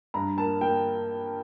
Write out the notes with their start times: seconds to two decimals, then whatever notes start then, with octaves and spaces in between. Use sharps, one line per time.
0.14 G2 A#5
0.37 A#3 A5
0.61 A#3 G5